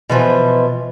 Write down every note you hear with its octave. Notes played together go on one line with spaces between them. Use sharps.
B2 E3 F3